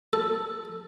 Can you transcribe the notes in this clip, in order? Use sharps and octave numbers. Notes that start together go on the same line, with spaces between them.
A4